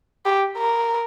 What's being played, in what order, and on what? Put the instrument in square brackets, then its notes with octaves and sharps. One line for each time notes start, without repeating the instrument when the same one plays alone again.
[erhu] G4
A#4